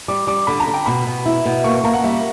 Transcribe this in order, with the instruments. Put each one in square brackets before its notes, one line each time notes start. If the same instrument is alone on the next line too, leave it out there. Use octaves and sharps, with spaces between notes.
[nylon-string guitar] G3 [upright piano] D6
[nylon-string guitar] G3 [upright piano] D6
[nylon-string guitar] D3 [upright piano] B5
[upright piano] A#5
[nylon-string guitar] D3
[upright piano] G5
[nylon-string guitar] B2 [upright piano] B5
[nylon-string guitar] B2
E4
B2
[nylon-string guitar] A#3 [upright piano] C#6
[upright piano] C#6
[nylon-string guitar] A#3 [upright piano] A#5
[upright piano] F#5
[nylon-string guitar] G3 [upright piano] E5